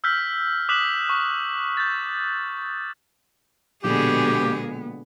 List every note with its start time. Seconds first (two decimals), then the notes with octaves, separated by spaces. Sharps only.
0.04 E6 F6 G6 B6
0.69 D6 D#6 F#6 B6 E7 F#7
1.09 C#6
1.77 G6 A6
3.84 A#1 B2 D3 G#3 B3 G4 G#4